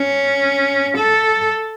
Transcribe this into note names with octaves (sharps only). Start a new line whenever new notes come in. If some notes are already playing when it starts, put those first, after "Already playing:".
Already playing: C#4
A4